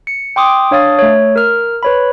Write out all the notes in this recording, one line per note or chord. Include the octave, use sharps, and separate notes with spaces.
C#7
G5 C6 D6 D#6
D4 C#5 F5 D#6 A6
A3 C#5
A#4 F6
B4 C#5 B5